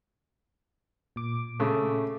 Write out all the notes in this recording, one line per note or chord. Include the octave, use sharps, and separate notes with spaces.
A#2 D6
C#3 A3